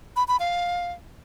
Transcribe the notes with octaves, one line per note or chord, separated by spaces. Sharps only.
B5
B5
F5